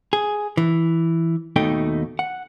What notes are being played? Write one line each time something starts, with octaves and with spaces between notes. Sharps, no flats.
G#4
E3
D#2 B2 A3 D#4 G5
F#5